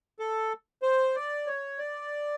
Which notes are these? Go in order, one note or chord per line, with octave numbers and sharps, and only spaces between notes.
A4
C5
D5
C#5
D5